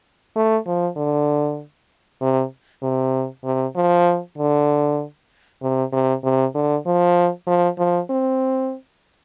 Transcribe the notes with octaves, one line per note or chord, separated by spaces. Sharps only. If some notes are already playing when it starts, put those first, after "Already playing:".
A3
F3
D3
C3
C3
C3
F3
D3
C3
C3
C3
D3
F3
F3
F3
C4